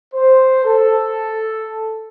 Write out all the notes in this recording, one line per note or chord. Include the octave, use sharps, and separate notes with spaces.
C5
A4